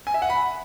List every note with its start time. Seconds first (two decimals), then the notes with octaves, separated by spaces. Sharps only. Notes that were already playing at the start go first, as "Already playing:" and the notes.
0.07 G#5
0.14 E5
0.22 F#5
0.30 B5